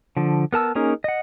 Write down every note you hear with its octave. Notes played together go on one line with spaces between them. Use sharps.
D3 F3
B3 A#4 A5 E6
A#3 C#4 D#4 G#4 A#4
D#5 F#5